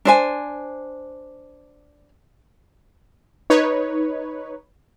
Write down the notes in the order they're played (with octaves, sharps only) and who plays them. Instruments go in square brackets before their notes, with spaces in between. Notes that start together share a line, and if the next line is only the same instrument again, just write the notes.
[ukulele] D4 C5 G#5
[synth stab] D#4 B4 C#5